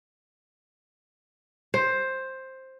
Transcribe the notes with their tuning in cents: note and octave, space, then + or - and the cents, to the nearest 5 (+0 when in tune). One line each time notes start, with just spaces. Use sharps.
C5 +10